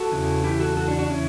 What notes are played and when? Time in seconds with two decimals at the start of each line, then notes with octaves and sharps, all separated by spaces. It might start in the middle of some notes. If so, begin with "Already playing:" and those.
Already playing: F#4 A4
0.12 E2 C#3 E3
0.44 E4 G4
0.60 F#4 A4
0.77 F#4 A4
0.88 D4 F#4
0.99 D4 F#4
1.09 C#4 E4